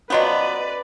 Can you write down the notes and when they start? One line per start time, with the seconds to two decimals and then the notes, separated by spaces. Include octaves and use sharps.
0.10 F3 F#3 B3 C#4 F#4 B4 D5 D#5